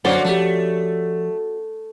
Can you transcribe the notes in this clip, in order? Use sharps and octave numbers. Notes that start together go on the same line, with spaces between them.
F#2 D3 A#3 C#4 F#4 C5 D5 C6
F3 A3 G4